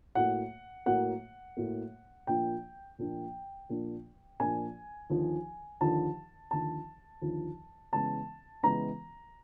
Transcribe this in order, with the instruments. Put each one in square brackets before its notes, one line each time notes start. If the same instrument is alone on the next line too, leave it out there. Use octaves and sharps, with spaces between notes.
[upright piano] A2 F#3 A#3 F#5
A2 F#3 A#3 F#5
A2 F#3 A#3
A#2 F3 A#3 D4 G5
A#2 F3 A#3 D4
A#2 F3 A#3 D4
A#2 F3 A#3 D4 G#5
D#2 D3 F3
D#2 D3 F3 A5
D#2 D3 F3 A5
D#2 D3 F3
C#3 E3 G#3 B3 A5
C#3 E3 G#3 B3 A#5